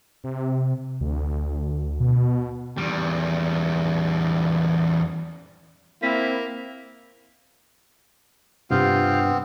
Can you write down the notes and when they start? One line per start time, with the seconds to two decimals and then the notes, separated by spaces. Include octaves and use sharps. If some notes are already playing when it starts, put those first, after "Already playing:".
0.24 C3
1.01 D2
2.00 B2
2.78 E2 G3
6.02 A#3 C4 E4 B6
8.71 G2 C3 B3 C4 F4 F5 G5